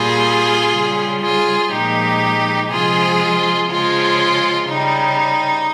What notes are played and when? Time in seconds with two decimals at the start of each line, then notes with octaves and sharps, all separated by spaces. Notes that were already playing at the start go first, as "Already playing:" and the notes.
Already playing: A#2 G3 F4 G#4
0.73 C#3 G3
1.22 F4 G#4
1.71 A#2 F3 G#3 D#4 G4
2.70 C3 F3 G#3 F4 G#4
3.69 C#3 F3 G#3 F4
4.67 C#3 G3 D#4